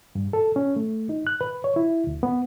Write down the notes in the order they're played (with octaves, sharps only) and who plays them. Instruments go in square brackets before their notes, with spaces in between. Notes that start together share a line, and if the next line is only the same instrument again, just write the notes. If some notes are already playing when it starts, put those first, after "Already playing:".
[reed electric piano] G2
A4
C#4
A3
D#4
F#6
B4
C#5
E4
D2
B3